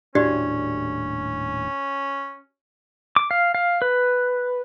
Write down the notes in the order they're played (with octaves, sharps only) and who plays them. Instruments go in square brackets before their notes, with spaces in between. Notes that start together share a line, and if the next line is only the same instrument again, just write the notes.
[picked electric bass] D#1 A2 D4 [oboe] C#4 [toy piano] F#4 G4 D5
[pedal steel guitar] D6
F5
F5
B4